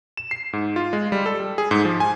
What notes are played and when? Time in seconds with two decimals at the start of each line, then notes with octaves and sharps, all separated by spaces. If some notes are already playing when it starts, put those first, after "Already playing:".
0.17 E7
0.31 C7
0.53 G#2
0.76 F4
0.93 G#3
1.12 G3
1.26 A4
1.40 G3
1.58 G#4
1.71 G#2
1.85 F3
2.00 G#5